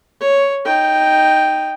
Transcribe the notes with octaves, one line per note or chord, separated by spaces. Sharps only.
C#5
D#4 G5